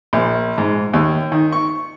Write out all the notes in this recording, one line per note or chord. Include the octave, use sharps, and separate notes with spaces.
A#1
G#2
D#2
D#3
C#6